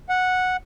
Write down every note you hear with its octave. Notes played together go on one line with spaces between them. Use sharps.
F#5